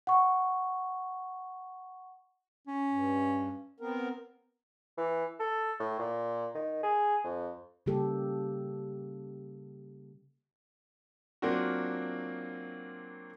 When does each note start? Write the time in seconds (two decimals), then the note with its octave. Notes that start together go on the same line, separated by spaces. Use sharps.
0.07 F#5 C#6
2.68 C#4
2.91 G2
3.80 B3 C4 A#4
4.98 E3
5.40 A4
5.80 A2
5.99 A#2
6.55 D#3
6.83 G#4
7.24 F2
7.86 C#3 G3 A#3 G4 A4
11.42 F#3 A#3 C4 D4 F4 F#4